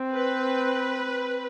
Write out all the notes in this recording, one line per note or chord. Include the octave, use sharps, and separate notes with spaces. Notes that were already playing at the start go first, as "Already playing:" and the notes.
Already playing: C4
B4